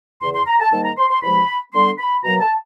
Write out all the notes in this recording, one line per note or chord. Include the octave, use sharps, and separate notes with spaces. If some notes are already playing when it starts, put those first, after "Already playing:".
E2 C#3 E3 C6
C6
A#5
A5
G#2 D#3 G3 A#3 A5
A#5
C6
C6
E2 C3 F3 G#3 B5
D3 G3 B3 C6
B5
B2 F#3 A#3 A#5
A5